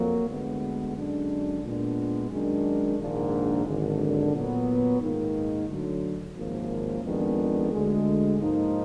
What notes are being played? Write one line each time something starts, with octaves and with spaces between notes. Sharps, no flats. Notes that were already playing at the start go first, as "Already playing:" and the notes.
Already playing: F2 F#3 A#3
D2 D3 G#3 B3
F#2 D3 G#3 D4
A#2 G#3 B3 D4
F#2 D#3 G#3 D4
A#1 G#2 D#3 A#3 D4
G#1 F#2 D3
A#2 F#3 B3
G#2 D#3 A#3 D#4
D2 D3 F#3
G#1 F#2 F3 A#3
F2 D#3 G#3 B3 D4
D2 D3 G#3
G#2 F3 A#3 D#4